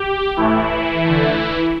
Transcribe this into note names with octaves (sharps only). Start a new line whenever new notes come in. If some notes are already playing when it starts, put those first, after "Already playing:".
Already playing: G4
A2 E3 A3 E4
D3 A3